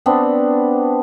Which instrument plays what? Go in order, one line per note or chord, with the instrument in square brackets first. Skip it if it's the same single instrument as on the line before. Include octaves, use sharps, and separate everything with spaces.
[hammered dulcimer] B3 C4 D4